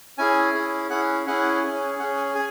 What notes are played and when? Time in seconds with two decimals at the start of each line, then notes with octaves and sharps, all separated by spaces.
0.18 C#4 E4 G#4 G#5
0.54 C#4 E4 G#4
0.90 C#4 E4 G#4 F#5
1.27 C#4 E4 G#4 F#5
1.63 C#4 G#4
1.98 C#4 F#5
2.03 G#4
2.17 G#5
2.35 G#4 G#5